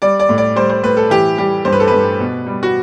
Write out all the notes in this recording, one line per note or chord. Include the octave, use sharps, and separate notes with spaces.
G3 D5
D5
A2
D5
G3 C5
C5
A2 B4
A4
E3 G4
G3 G4
G2 C5
B4
A4
G2 B4
B2
G3
F#4